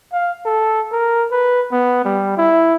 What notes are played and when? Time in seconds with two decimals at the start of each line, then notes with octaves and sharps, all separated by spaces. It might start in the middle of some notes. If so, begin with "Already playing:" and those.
0.12 F5
0.45 A4
0.92 A#4
1.31 B4
1.72 B3
2.05 G3
2.37 E4